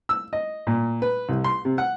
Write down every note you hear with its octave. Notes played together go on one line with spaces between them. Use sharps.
E6
D#5
A#2
B4
C2
C6
C3
F#5